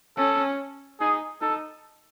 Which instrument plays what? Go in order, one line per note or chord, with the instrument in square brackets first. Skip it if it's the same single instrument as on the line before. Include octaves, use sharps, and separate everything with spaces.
[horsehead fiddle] C#4 [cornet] A4
[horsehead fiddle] D#4 [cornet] G#4
[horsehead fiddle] D#4 [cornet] A4